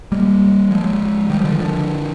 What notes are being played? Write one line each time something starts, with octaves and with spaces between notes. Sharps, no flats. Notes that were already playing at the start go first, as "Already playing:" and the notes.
G3 A#3
F3 G#3
D#3 G3
D3 F3
D3 F3